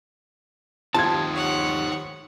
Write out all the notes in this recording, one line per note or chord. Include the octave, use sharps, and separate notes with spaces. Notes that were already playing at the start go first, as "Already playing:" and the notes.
D#2 D#4 F4 G4 C5 A5 G#6
C#5 F#5